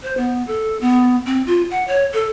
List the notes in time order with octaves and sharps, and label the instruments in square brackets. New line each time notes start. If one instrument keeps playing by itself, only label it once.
[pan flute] C5
B3
A4
B3
C4
F4
F#5
C#5
A4